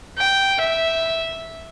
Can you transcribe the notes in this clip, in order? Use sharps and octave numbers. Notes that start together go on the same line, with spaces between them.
G5
E5